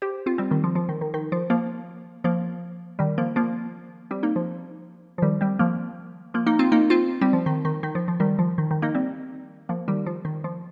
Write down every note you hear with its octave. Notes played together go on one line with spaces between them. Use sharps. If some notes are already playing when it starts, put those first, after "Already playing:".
G4 C5
C4 F4
G3 C4
D#3 G3
F3
F3
D#3
D#3
D#3
F3
F3 A#3
F3 A#3
D#3 G3
F3 A#3
F3 A#3
G3 C4
A#3 D#4
F3
F3
D#3 G3
G3 C4
F3 A#3
F3 A#3
A#3 D#4
C4 F4
A#3 D#4
C4 F4
G3 C4
F3
D#3
D#3
D#3
F3
F3
D#3 G3
F3
D#3
D#3
A#3 D#4
G3 C4
F3 A#3
D#3 G3
F3
D#3
F3